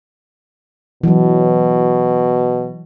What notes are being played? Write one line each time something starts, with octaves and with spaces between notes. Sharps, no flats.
B2 E3 F#3